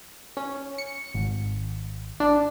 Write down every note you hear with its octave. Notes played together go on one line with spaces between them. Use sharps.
C#4
C#7
G#1
D4